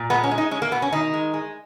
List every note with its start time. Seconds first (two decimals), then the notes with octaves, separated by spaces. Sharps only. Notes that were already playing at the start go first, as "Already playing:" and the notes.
Already playing: A#2
0.10 G#3 B3
0.24 C#4
0.31 G#3
0.38 D#4
0.51 G#3 C#4
0.62 A#3
0.71 B2 B3
0.82 C#4
0.92 D#3 D#4
1.14 G#3
1.34 G#3